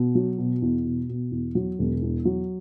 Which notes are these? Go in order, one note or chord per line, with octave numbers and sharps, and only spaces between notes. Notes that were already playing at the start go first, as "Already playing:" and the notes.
Already playing: B2
F#3
B2
E2
B2
B2
E2
F#3
E1
E2
F#3